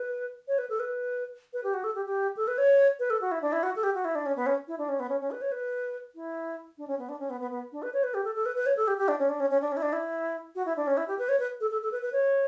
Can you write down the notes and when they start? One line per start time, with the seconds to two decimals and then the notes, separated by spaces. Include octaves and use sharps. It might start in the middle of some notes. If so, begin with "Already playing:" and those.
Already playing: B4
0.48 C#5
0.58 B4
0.70 A4
0.80 B4
1.53 B4
1.64 G4
1.74 F#4
1.84 A4
1.95 G4
2.06 G4
2.37 A4
2.48 B4
2.58 C#5
2.99 B4
3.10 A4
3.21 F#4
3.32 E4
3.42 D4
3.52 E4
3.63 F#4
3.76 A4
3.83 G4
3.95 F#4
4.05 E4
4.15 D4
4.26 C#4
4.36 B3
4.46 C#4
4.68 E4
4.78 D4
4.89 C#4
5.00 B3
5.09 C#4
5.21 C#4
5.31 B4
5.42 C#5
5.52 B4
6.15 E4
6.78 D4
6.88 C#4
6.99 B3
7.09 D4
7.20 C#4
7.30 B3
7.40 B3
7.51 B3
7.72 D4
7.83 B4
7.94 C#5
8.03 B4
8.14 G4
8.25 A4
8.35 A4
8.46 B4
8.56 B4
8.66 C#5
8.77 A4
8.88 G4
8.98 G4
9.08 D4
9.19 C#4
9.29 D4
9.40 C#4
9.50 C#4
9.61 D4
9.72 C#4
9.77 E4
9.82 D4
9.93 E4
10.55 F#4
10.66 E4
10.77 D4
10.87 C#4
10.97 E4
11.08 G4
11.19 B4
11.29 C#5
11.40 B4
11.61 A4
11.71 A4
11.82 A4
11.92 B4
12.02 B4
12.13 C#5